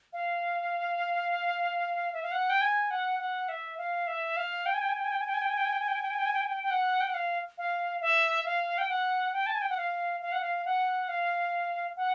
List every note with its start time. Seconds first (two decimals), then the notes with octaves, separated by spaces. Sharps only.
0.13 F5
2.14 E5
2.23 F5
2.32 F#5
2.50 G5
2.61 G#5
2.91 F#5
3.20 F#5
3.49 E5
3.78 F5
4.07 E5
4.37 F5
4.66 G5
4.74 G#5
4.81 G5
4.89 G#5
4.96 G5
5.04 G#5
5.11 G5
5.20 G#5
5.27 G5
5.34 G#5
5.42 G5
5.49 G#5
5.57 G5
5.65 G#5
5.72 G5
5.80 G#5
5.88 G5
5.95 G#5
6.02 G5
6.11 G#5
6.18 G5
6.25 G#5
6.34 G5
6.41 G#5
6.48 G5
6.63 G5
6.71 F#5
7.01 G5
7.07 F#5
7.14 F5
7.58 F5
8.01 E5
8.45 F5
8.78 G5
8.89 F#5
9.33 G5
9.46 A5
9.55 G#5
9.61 G5
9.69 F#5
9.77 F5
10.22 F5
10.32 F#5
10.41 F5
10.65 F#5
11.08 F5
11.97 F#5